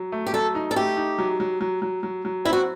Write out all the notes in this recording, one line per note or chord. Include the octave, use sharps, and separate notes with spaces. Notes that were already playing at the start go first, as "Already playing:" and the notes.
Already playing: F#3
A3
G4
F#3 A4
D#4
A4
A3 G4
D#4
F#3
F#3
F#3
F#3
F#3
F#3
C4 E4
F#4